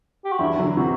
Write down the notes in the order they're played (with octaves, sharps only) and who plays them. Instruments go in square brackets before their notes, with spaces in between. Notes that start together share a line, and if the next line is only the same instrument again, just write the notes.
[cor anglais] G4
F#4
[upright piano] E2 G2 [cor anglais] E4
[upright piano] D3 F#3
[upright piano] C3 E3 [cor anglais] F#4